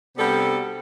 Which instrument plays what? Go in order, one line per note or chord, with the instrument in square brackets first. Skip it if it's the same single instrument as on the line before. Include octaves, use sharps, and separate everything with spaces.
[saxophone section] C3 G3 B3 D4 F#4 A4